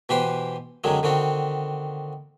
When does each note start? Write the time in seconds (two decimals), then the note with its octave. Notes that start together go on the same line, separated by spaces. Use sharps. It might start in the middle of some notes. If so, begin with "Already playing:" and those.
0.09 B2 E3 G4 B4 C5 G5
0.84 F#2 D3 D#3 F#3 G#3
1.03 D3 D#3 C4 F#4